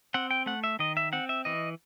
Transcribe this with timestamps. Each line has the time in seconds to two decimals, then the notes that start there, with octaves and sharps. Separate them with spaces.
0.14 C4 F#5
0.31 G5
0.46 A3 F#5
0.64 E5
0.79 D#3 D#5
0.97 E5
1.13 C4 F#5
1.29 E5
1.45 E3 D#5